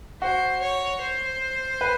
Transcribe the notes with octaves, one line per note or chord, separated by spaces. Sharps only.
F#4 C5
C#5
C5
B4